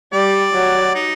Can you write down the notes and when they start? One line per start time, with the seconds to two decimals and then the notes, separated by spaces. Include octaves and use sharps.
0.13 G3 D5
0.54 F#3
0.95 D#4